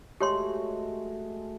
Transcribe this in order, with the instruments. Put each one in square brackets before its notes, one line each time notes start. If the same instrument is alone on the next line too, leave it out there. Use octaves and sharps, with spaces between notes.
[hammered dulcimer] G#3 A3 F#4 [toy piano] G4 C#5 C6